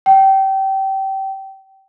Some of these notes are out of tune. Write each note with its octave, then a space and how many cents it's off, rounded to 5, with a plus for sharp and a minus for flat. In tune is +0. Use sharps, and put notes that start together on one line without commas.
G5 -25